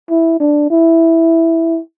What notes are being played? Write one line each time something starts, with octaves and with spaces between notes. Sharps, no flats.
E4
D4
E4